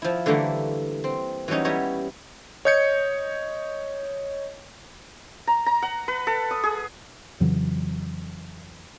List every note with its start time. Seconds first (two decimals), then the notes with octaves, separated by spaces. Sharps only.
0.02 F3 E4
0.26 D3 E3 G3 A3 A#3
1.04 C4
1.48 E3 F#3 G3 C#4 D#4
1.65 G3 B3 E4 C#5 D#5
2.65 C#5 D#5 G6 G#6 C#7
5.47 A#5
5.66 A#5
5.82 F#5
6.08 B4
6.27 A4
6.51 D#6
6.63 G#4
7.40 F2 C#3 E3 F#3